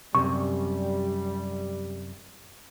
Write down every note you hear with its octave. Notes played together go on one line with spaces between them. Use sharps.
F#2 C3 G3 C#6